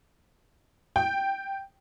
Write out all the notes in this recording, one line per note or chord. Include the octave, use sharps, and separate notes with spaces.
G5